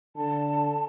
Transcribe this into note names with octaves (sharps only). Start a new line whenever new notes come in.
D3 A5